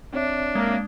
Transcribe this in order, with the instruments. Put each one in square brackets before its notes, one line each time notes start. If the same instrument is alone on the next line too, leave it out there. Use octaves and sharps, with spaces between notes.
[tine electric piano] C4 C#5 E5 [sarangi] D4
[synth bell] G#3 [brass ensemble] A#3